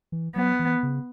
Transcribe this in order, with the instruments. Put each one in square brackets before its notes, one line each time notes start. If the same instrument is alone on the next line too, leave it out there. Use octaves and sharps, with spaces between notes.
[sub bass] E3
[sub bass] F#3 [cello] B3
[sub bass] E3
C#3